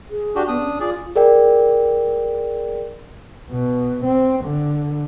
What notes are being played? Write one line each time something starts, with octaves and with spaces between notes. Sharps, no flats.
G#4
D4 F#4 G4
B3 D4 D#6
C#4
F4 G#4 D5
G#4 A#4 D5 G5
B2
C4
D3